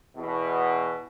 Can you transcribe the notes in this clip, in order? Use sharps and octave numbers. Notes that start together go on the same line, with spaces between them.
E2 B2